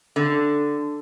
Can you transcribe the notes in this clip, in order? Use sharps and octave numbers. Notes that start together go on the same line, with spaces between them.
D3